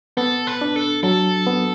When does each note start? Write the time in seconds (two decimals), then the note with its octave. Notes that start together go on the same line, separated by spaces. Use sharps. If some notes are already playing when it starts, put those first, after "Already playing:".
0.17 B3 A4
0.47 B4
0.61 D4
0.76 A4
1.03 F#3 A4
1.47 B3